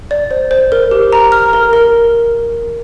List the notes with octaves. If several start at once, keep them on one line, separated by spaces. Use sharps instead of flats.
D5
C5
C5
A#4
G4
A#5
F6
A#4
A#4